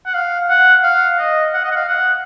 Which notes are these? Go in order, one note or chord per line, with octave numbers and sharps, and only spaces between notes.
F#5
F5
F#5
F5
D#5
F#5
D#5
F#5
F5
F#5